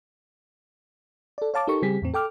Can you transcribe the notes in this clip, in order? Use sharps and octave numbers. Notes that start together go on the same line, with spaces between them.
A4 D5
C#5 F5 A5 D6
D#4 G4 A4 A#4 C#6
C#3 G3 C4 G4 G#4 B6
E2 A2 C4
A4 G5 D6 F6